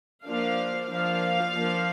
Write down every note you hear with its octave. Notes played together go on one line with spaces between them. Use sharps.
F3 A#3 D4 F5
F3 A#3 D4 F5
F3 A#3 D4